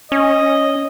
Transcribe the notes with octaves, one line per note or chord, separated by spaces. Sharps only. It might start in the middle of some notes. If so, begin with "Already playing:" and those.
C#4 D#5